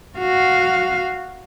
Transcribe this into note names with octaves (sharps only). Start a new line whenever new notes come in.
F#4 F5